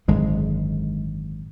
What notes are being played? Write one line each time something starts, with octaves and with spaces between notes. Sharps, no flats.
G#1 F#2 D3 G#3